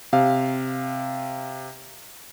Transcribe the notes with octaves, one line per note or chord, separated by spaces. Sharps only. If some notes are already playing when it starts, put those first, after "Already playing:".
C3 F5